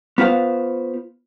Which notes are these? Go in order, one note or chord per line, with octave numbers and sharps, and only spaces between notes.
B3 F4 C5 F5